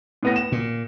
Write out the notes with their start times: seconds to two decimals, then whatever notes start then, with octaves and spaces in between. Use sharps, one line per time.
0.23 A2 B3 A#6
0.36 E7
0.52 A#2